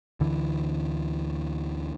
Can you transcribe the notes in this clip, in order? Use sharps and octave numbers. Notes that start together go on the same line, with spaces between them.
D2 D3 E3